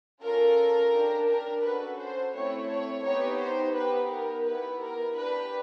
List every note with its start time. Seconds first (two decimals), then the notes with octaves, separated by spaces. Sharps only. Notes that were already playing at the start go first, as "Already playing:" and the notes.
0.23 C#4 F4 A4 A#4
0.93 D4 G4
1.29 A#4
1.64 C#4 F#4 A4 B4
1.99 C5
2.34 A3 C4 E4 C#5
2.69 C#5
3.04 B3 D#4 G4 C#5
3.40 C5
3.75 B3 D#4 G4 B4
4.11 A#4
4.45 B3 E4 G4 B4
4.81 A#4
5.16 D4 G4 B4